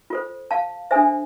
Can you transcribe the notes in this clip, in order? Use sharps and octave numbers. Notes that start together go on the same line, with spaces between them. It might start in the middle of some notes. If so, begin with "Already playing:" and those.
F4 A4 C5
F5 A5
D4 A4 C5 E5 G#5